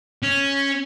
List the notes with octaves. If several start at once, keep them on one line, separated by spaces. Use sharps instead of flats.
C#4